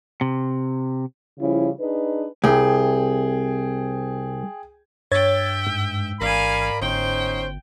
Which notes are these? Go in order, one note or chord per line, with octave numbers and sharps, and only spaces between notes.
C3
C#3 F3 G3 C#4 E4
D4 D#4 G#4 B4
C2 G#4 G5
G2 C#5 E5 G5 G#6 A6
G#2
A1 A#4 D5 F5 G#5 B5
G1 C#4 D#4 C5 G5